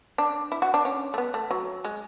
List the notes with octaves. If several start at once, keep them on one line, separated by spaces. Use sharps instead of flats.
D4
E4
F#4
D4
C#4
A3
B3
A3
F#3
G#3